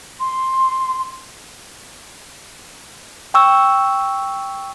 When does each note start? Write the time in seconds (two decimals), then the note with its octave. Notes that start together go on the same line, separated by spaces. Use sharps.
0.20 C6
3.34 G5 C#6 E6